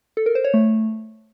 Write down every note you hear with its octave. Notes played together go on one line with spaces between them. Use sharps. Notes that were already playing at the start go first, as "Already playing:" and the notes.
A4
A#4
C5
C#5
A3